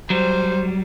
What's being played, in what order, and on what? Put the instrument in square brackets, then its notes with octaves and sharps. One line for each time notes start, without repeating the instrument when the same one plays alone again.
[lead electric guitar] F#3 G3 [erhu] C5